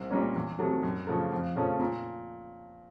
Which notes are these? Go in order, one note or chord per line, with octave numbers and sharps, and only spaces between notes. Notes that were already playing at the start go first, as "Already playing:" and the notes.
Already playing: C2
A#2 G3 A#3 C#4
E2
C3 D#3 F#3 A3
F#2
C#3 F3 A3
F2
C#3 F3 A3 C#4
A#2